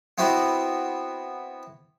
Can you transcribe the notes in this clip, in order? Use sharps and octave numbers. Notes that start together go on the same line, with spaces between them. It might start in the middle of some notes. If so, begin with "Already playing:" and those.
B3 C4 E4 F#4